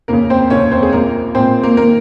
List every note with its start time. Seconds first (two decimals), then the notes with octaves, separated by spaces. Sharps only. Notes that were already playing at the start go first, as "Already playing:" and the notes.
0.08 F1 D#2 C#3 A#3 A#4
0.30 C4 C5
0.50 F1 D#2 C#3 C#4 C#5
0.72 C4 C5
0.83 G#4
0.93 A#1 A#2 A#3 A#4
1.35 A#1 A#2 C4 C5
1.63 A#3 A#4
1.77 D#3 A#3 A#4